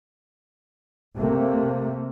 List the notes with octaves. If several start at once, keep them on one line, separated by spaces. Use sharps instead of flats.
C3 A3 A#3